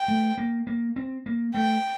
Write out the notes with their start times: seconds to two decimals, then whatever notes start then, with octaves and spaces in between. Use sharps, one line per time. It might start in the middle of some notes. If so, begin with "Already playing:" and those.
Already playing: G5
0.08 A3
0.38 A#3
0.67 A#3
0.96 C4
1.26 A#3
1.54 A3 G5